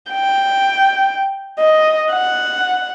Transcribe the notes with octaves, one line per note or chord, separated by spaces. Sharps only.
G5
D#5
F#5